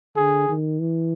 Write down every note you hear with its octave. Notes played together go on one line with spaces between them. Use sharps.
D3 G#4
D#3
E3